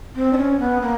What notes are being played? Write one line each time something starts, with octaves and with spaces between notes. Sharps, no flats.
C4
D4
C#4
B3
A#3